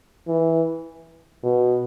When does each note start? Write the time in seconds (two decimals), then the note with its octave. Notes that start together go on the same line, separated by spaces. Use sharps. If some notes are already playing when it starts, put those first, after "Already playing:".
0.27 E3
1.43 B2